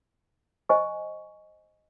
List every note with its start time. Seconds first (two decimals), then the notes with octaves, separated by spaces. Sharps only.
0.69 C5 D#5 G#5 C#6